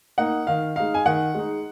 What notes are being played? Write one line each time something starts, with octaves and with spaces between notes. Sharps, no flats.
A#3 D#4 F#5
D#3 F5
G#3 D#4 F5
G#5
D#3 F#5
G#3 D#4